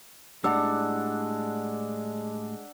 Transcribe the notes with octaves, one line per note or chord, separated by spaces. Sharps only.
A2 G3 G#3 D4 F#5 E6